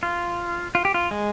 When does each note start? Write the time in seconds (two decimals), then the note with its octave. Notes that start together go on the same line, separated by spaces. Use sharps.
0.03 F4
0.75 F4
0.85 G4
0.94 F4
1.11 G#3